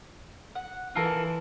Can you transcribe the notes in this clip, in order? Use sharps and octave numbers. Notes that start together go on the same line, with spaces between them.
F#5
E3 F4 A4 A#4